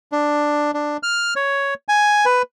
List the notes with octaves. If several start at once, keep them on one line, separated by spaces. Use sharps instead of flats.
D4
D4
F6
C#5
G#5
B4